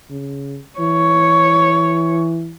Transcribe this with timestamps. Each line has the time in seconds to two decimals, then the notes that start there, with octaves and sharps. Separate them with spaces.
0.10 C#3
0.79 E3 C#5